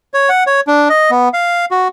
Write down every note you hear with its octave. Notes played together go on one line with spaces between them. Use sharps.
C#5
F#5
C#5
D4
D#5
B3
F5
F#4